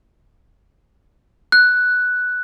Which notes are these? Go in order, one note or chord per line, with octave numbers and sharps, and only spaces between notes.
F#6